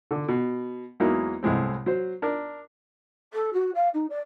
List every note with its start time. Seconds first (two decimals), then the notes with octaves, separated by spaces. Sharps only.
0.11 D3
0.28 B2
1.00 E2 F#3 G#3 A#3 D#4 E4
1.43 C2 A2 G#3 C4
1.86 F#3 C5
2.22 D4 A#4
3.33 A4
3.53 F#4
3.74 F5
3.94 D#4
4.09 D5